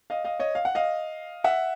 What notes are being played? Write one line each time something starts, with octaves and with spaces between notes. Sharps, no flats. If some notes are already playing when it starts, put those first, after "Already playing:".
D#5 F5
D#5 F5
C#5 D#5
F5
F#5
D#5 F5
E5 F#5